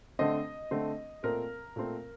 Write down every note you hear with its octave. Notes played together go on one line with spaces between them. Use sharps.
D3 A3 C4 D#5
D3 A3 C4
A#2 A3 C4 A#4
A#2 A3 C4